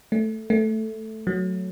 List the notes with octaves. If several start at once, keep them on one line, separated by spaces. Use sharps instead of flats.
A3
A3
F#3